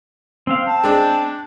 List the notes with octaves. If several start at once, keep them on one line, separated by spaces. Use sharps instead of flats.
C4 F5
C4 A5
G#3 D4